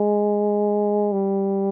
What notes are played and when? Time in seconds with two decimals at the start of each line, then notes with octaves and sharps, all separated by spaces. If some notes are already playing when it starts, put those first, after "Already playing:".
Already playing: G#3
1.12 G3